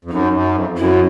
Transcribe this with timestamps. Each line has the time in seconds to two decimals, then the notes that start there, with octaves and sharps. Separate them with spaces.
0.05 F2
0.11 F#2 D#4
0.33 F#2
0.55 F2
0.70 F2
0.77 F#2 E4